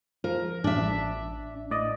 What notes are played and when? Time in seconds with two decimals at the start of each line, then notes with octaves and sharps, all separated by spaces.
0.24 F3 A#4
0.64 A1 D4 E5
1.71 A2 D5 D#5